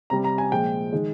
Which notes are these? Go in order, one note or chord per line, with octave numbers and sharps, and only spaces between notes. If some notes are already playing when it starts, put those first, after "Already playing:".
C3 G3 A#5
A#5
G#5
A#2 F3 G#3 G5
D#3 G#3